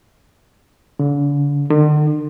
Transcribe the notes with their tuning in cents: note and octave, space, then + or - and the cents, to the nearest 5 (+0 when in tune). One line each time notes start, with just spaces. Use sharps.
D3 -40
D3 +45